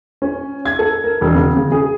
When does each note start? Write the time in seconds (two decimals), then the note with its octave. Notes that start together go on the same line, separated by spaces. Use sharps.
0.22 C#4
0.66 G#6
0.79 A4
1.04 A#4
1.21 E1
1.35 C#3
1.56 C#3
1.72 G#4